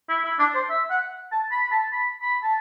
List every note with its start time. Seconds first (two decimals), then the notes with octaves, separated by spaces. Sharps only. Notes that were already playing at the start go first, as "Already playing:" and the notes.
0.09 E4
0.24 E4
0.39 D4
0.55 C5
0.70 E5
0.91 F#5
1.32 A5
1.51 B5
1.65 B5
1.71 A5
1.93 B5
2.22 B5
2.43 A5